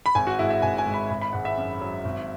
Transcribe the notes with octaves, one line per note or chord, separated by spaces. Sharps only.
B5
G#1 G#5
F#4
G#2 E4
E5
G#1 G#5
G#5
G#2
B5
G#1 B5
B5
G#1 F#5
E5
F#2
F#3
G#1